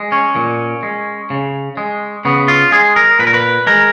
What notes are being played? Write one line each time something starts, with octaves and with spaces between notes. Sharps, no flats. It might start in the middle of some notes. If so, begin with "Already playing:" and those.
Already playing: G#3
C#4
A#2
G#3
C#3
G#3
C#3 B3
F4
G#3 G#4
A#4
A#2 B4
A#4
B4
G#3 A#4